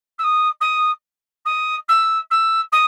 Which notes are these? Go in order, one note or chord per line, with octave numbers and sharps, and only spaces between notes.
E6
D#6
D#6
D#6
E6
E6
D#6